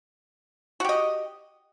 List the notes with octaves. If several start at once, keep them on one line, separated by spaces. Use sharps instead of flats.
F#4 G4 D#5